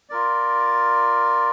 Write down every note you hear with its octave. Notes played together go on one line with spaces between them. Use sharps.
F4 A#4 D5